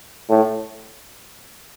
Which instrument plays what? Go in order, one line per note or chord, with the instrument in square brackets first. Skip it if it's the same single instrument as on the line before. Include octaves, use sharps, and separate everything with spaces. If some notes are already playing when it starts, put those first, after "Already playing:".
[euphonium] A2